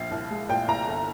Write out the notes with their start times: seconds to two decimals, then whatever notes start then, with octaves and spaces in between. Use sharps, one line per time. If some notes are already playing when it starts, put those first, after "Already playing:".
Already playing: A#1 F5
0.11 C2
0.31 G#3
0.49 A#2 G5
0.68 C2 A#5
0.88 G1